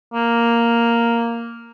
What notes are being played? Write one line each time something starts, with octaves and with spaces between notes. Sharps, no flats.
A#3